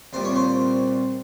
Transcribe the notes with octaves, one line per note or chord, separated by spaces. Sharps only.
C2 A#2 G3 C5
C#5
C5